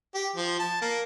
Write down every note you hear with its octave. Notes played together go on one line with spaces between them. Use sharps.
G4
F3
A5
A#3